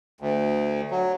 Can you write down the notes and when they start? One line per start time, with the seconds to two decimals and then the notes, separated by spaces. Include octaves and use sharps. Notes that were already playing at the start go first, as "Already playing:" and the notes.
0.21 D2
0.91 F#3